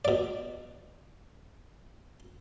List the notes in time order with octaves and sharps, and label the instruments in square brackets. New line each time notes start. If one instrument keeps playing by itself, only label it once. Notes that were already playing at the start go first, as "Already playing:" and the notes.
[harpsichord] B2 D5